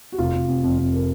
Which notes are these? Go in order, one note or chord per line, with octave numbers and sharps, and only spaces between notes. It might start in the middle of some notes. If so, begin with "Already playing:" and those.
F#4
F1 F4
F1
C3
F2
F2
A#4